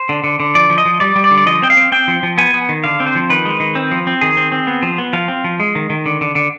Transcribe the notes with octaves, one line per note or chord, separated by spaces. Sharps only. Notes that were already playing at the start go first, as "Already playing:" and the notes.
Already playing: C5
D3
D3
D3
F3 D5
F3
D#5
F3
G3 D5
G3
D5
D3
D5
F3 D#5
C4 G5
F5
C4
C4 G5
F3
F3
B3 G#5
B3
D#3
D3 F5
C4
C5
F3
D#3 B4
G#3
D#3
C4
F3
C4
D#3 G#4
C4
C4
B3
F3
B3
F3 F5
C4
F3
G#3
D#3
D#3
D3
D3
D3